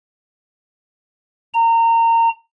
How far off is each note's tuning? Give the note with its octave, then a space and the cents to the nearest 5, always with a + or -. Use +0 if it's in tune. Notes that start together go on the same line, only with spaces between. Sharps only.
A#5 -25